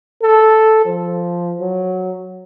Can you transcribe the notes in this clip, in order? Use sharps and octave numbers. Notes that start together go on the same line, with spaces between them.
A4
F3
F#3